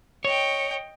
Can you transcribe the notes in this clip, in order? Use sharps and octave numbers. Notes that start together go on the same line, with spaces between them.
C#5 D#5 G5